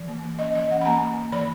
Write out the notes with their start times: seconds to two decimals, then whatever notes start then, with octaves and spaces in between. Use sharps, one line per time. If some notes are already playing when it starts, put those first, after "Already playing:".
Already playing: E3
0.08 A#3
0.23 A#3
0.39 C#4 D#5
0.55 E3 D#5
0.71 C#4 F#5
0.81 B5
0.85 A#3 A#5
1.01 A#3
1.16 A#3
1.32 E3 B5